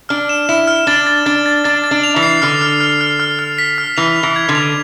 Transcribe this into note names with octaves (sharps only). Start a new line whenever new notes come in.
D4 F6
E7
E4 E7
F6
D4 A6
A6
D4 A6
A6
D4 A6
A6
D4
F7
E3
C7
D3 F6
F6
F6
F6
F6
F6
B6
F6
E3 F7
F7
E3
G#6
D3
F7